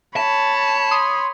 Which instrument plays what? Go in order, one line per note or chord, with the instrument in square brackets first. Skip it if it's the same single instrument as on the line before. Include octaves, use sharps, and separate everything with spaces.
[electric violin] C#5 B5 [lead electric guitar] A5
[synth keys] C6 D#6